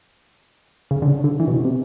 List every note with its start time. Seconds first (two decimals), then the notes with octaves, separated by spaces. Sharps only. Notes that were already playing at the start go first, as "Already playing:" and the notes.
0.91 C#3
1.02 D3
1.07 C#3
1.24 D3
1.40 E3
1.47 B2
1.52 C3
1.65 C3